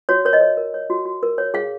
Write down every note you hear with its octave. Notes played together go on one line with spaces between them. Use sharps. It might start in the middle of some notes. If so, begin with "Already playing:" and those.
F#4 C#5
A#4 C#5
D#5
C#5
A#4
C#5
F#4
F#4
A#4
C#5
G#4 F5